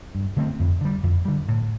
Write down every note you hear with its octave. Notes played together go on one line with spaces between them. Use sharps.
G2
D3 A3 C4
F2
D3 G3
F2
D3 G3
A2